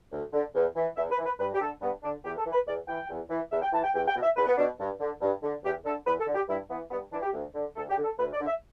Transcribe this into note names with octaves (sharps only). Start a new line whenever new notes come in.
D2
D3
E2
E3
E2 E5
B4
E3
B4
G2 B4
G4
D3 A4
G2 B3
D3 D4
E2 G4
A4
E3
B4
E2 D5
E3 G5
E2
E3
E2 E5
G5
E3 A5
G5
E2 G5
G5
B2
E5
E2 B4
B3
B2 D4
G2
D3
G2
D3
E2 G4
D3 A4
E2 B4
A4
D3
G4
G2 E4
E3 B3
G2 B3
E3 D4
G4
D2
D3
D2 A4
G4
D3
A4
D2 B4
D5
D3
E5